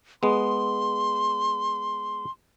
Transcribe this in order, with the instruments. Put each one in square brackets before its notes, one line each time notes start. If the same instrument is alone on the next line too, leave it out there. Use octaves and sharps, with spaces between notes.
[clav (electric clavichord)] G#3 B3 [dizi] C6